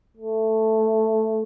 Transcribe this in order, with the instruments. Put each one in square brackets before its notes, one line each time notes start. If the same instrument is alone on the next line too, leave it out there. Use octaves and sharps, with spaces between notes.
[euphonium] A3